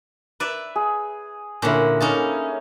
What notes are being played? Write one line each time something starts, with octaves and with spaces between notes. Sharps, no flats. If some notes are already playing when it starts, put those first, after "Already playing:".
B4 D5 E5
G#4
A#2 D3 C#4 E4
A#3 C#4 D#4 A5